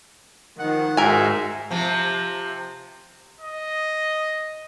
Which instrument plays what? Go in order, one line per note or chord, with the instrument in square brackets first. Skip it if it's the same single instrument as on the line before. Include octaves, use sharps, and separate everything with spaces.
[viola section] D#3 F3 [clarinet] F#5
[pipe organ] G#2 E5 [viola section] F#4 [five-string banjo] A#4 G#5
[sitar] C3 F3
[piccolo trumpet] D#5